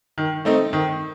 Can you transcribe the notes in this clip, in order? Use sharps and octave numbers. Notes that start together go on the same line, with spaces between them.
D#3
A3 C4 D#4
D#3